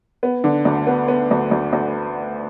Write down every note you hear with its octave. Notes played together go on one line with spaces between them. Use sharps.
B3
D3
D2
B3
B3
D2
D2
D2